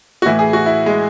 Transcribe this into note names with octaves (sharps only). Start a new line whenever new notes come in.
F#4
A2 E3 E4
G#4
F#4
E4
G#3